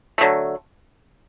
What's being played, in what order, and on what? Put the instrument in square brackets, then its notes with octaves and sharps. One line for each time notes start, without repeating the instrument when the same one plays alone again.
[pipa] D3 F#3 A3